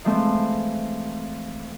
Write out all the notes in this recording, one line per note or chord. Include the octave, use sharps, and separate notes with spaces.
E3 F3 G#3 A3 C4